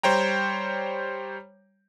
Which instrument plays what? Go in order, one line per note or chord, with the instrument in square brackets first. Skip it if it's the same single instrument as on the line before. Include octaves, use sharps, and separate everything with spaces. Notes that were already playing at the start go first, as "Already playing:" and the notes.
[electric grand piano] G3 C5 C#5 G5 A#5